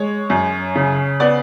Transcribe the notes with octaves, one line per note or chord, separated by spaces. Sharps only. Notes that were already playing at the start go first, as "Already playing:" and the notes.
Already playing: G#3 C#5
F#2
C#3
B3 D5